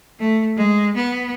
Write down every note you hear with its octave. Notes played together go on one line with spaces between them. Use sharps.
A3
G#3
B3